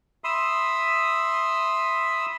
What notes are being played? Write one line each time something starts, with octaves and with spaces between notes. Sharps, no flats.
E5 B5 C6 D#6 E6